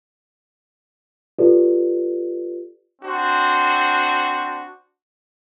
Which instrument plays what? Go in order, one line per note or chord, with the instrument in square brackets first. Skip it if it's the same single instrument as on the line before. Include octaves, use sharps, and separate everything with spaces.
[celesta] F4 G4 A4 B4 D5
[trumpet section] C4 D4 F#4 C5